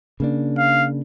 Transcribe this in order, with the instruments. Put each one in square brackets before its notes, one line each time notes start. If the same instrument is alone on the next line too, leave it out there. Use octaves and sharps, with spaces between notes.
[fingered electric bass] C#3 A#3 D4
[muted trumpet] F5